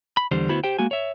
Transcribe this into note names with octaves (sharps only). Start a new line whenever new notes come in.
B5
E2 D3 G3 C5
D2 B3 E4 F#4 C5 B5
G4 C5 G5
G#3 A#3 F#4 G#5
C#5 E5